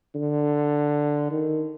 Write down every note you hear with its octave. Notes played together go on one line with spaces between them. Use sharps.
D3
D#3